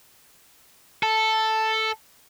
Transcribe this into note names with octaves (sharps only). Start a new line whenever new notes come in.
A4